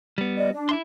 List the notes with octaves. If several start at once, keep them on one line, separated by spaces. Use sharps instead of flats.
G3 B3
D5 D#5
D4
E4 E5 C6